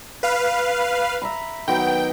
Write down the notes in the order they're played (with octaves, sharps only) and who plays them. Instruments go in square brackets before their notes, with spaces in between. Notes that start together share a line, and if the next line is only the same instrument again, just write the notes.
[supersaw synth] B4 F5
[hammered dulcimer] E5 A#5 B5
[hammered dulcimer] D#3 F#3 B3 [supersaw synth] G5